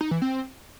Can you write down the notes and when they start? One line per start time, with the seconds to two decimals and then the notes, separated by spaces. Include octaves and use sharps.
0.01 D#4
0.11 E3
0.22 C4